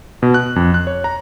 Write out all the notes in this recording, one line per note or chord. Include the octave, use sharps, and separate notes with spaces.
B2
F#6
F2
F#6
C#5
A#5